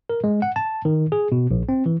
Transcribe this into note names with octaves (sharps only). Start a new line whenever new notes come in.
A#4
G#3
F#5
A5
D#3
G#4
B2
A#1
C4
E3